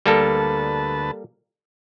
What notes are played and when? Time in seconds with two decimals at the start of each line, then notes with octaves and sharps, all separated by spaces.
0.06 D2 G3 A#3 A4 B4 A5